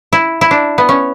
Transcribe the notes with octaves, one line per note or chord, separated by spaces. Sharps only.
E4
E4
D4
B3
C#4